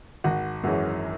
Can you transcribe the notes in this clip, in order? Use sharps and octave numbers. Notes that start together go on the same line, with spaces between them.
G#1 F#4
F#2 E3 G#3 C#4 F#4